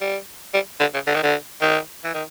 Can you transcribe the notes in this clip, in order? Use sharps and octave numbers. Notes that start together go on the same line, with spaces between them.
G3
G3
D3
C#3
D3
D#3
D3
D#3
E3
D#3